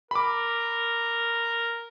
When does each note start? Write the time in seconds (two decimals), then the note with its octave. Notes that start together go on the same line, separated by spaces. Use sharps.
0.11 A#4 B5 D6